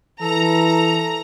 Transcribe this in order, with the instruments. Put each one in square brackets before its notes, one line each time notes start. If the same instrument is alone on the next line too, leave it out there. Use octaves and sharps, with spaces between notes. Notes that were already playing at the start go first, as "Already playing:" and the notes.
[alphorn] E3 [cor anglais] A4 [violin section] A#5